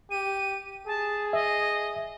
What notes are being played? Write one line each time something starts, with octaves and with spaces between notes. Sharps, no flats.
G4 D#7
G#4 A5
D#5 E5